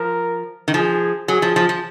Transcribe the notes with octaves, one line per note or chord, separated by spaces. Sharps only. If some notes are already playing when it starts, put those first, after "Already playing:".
Already playing: F3 A#4
D#3
F3 G#4
F#3 G#4
F3
F3
F3